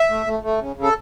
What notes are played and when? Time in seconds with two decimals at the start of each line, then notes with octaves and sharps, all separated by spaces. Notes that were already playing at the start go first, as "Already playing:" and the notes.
Already playing: E5
0.10 A3
0.26 A3
0.43 A3
0.60 C#3
0.76 C#3
0.83 A4